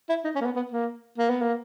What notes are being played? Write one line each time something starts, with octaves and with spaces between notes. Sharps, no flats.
E4
D#4
C#4
A#3
B3
B3
A#3
A#3
B3
A#3